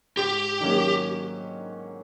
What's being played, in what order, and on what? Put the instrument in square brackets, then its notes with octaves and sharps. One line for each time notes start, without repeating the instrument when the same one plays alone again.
[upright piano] G#2 [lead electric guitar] G4
[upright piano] D#3 F#3 A#3 C#4